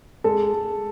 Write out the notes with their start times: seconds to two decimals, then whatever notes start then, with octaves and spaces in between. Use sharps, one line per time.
0.24 G#3 A4
0.54 G#3